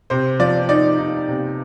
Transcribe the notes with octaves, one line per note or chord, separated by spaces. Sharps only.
C3 C5
F3 D5
D#4 D5
D#4
C3